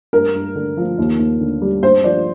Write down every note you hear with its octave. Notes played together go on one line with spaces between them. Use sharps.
G2 A#4
G2
D3
F3
D#2
D#2
D3
G3
G2 C5
F3 D5